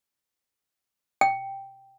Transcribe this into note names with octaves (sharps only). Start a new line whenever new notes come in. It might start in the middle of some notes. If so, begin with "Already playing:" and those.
G5